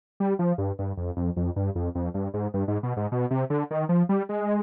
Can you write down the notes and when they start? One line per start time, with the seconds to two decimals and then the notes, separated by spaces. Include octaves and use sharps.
0.20 G3
0.39 F3
0.58 G2
0.79 G2
0.97 F2
1.17 F2
1.36 F2
1.56 G2
1.75 F2
1.95 F2
2.14 G2
2.34 G#2
2.54 G2
2.68 G#2
2.83 B2
2.97 G#2
3.12 B2
3.31 C3
3.50 D3
3.71 D#3
3.89 F3
4.09 G3
4.29 G#3